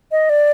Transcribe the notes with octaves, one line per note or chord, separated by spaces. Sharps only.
D#5
D5